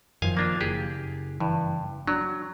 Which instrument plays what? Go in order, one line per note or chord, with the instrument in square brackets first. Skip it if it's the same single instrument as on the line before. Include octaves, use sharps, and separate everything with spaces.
[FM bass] F#2 [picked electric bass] D#3 F3 [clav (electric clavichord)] F5 G#5
[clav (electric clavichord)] A#3 D4 F4
[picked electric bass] F#1 [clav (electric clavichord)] G4 G#4
[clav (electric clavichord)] G2 [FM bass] E3
[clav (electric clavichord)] F#3 [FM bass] D4